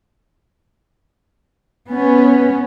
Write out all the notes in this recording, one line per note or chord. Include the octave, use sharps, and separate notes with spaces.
B3 C#4